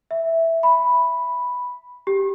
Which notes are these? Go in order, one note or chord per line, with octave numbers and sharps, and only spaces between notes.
E5
B5
G4